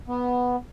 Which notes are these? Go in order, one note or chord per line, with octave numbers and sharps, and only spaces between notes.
B3